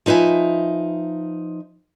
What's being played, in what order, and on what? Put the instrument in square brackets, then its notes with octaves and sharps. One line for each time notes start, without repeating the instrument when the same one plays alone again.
[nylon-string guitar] F3 D#4 B4 E5 G#5